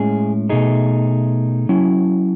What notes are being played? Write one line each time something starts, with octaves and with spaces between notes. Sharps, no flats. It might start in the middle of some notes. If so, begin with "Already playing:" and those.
Already playing: A2 G#3 C#4 E4 G#4
B2 A3 D#4 G#4
F#3 C#4 E4